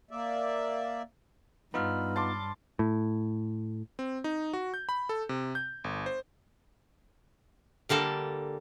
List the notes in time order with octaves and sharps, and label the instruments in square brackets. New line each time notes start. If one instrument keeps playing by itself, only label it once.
[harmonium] A#3 D5 E5
[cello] G2 [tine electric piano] B3 D#4 F4 [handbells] B5 E6 F6
[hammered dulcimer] A5 C6 D6
[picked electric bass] A2
[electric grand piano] C4
D#4
F#4
G6
B5
A4
C3
G6
G1
C5
[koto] D3 G3 A#3 A4